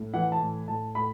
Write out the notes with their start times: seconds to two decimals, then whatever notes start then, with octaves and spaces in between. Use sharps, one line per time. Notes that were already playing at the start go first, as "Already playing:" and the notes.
Already playing: A2
0.13 E3 F#5
0.32 A5
0.41 A2
0.68 A2 A5
0.95 A2 B5